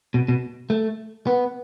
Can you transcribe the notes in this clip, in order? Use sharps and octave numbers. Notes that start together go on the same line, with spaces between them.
B2
B2
A3
B3